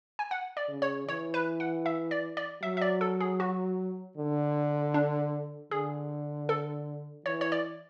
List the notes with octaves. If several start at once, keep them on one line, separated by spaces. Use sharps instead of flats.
G#5
F#5
D5
C#3
C#5
E3 C#5
B4
F#5
E5
D5
D5
F#3 E5
E5
D5
A4
G#4
F#4
D3
D4
D3 G#4
A4
E3 C#5
C#5
D5